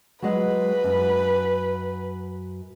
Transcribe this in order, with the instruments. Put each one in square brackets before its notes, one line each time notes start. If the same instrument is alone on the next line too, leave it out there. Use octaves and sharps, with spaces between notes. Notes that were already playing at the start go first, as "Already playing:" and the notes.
[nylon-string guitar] F#3 G#3 F#5 [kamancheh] B4
[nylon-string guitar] F#2